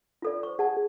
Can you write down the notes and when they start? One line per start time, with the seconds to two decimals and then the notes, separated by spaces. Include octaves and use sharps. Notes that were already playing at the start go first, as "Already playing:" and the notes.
0.22 F4 A4 D5
0.43 C5 C#6
0.59 G#4 F#5 A5